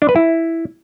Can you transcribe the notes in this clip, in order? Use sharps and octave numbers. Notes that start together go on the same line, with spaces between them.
D4
B4
E4